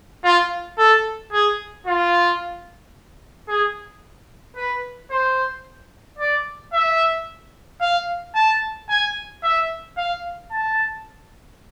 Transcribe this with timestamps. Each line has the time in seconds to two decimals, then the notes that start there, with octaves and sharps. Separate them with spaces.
0.24 F4
0.78 A4
1.32 G#4
1.86 F4
3.48 G#4
4.57 B4
5.11 C5
6.19 D5
6.73 E5
7.81 F5
8.35 A5
8.89 G#5
9.43 E5
9.97 F5
10.51 A5